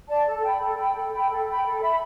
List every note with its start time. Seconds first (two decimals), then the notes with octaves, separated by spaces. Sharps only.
0.08 D5 A5
0.25 A4
0.43 G5 B5
0.60 A4
0.78 G5 B5
0.95 A4
1.12 G5 B5
1.29 A4
1.47 G5 B5
1.64 A4
1.81 E5 B5